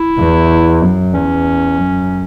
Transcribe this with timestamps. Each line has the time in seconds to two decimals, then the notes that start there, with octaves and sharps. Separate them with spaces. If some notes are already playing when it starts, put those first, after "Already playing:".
Already playing: E4
0.18 E2
0.82 F#2
1.14 E2 C#4
1.78 F#2